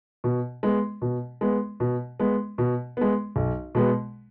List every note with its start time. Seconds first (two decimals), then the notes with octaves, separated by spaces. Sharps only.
0.24 B2
0.63 G#3 B3
1.02 B2
1.41 G#3 B3
1.80 B2
2.20 G#3 B3
2.58 B2
2.97 G#3 B3
3.36 B1
3.75 B2 G#3 B3